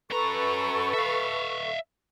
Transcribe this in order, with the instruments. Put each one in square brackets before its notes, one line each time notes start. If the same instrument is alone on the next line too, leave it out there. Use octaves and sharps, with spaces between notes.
[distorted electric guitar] F#2 A#5 [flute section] A4 B4 C#6
[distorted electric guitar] E5 F5